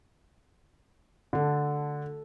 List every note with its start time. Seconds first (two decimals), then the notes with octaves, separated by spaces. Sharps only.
1.33 D3 F#4 A4